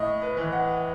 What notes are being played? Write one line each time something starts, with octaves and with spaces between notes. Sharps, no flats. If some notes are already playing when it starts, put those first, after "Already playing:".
Already playing: A2 D#5
B4
E3
F#5